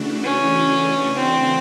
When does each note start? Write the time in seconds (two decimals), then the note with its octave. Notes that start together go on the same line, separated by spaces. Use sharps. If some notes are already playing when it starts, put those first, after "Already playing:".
Already playing: C#3 E3 A3 D4 F#4
0.23 C#4
1.16 C4